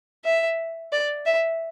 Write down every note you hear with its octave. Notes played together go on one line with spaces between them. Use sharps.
E5
D5
E5